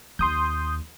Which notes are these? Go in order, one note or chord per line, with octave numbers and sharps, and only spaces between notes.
D#2 C6 D#6 G6